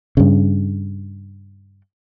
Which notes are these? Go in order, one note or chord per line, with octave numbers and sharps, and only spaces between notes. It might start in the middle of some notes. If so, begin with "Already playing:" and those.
G2 C#3